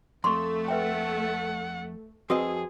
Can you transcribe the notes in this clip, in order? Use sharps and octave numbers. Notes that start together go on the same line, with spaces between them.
F2 A3 C6 C#6
B4 E5 F#5 G5
F2 C4 F#4 G#4 B4 D#5 D#6